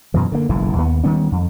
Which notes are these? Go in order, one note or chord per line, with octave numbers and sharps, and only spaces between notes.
F#2 B2 E3
D3 A#3
F#1 B1 G#2 E3
D#2 A3 B3
D#3 G3 B3 C#4
F2